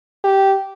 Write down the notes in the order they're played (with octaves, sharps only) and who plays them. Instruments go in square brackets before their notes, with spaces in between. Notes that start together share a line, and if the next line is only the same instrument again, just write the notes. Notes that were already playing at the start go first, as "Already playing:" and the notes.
[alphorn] G4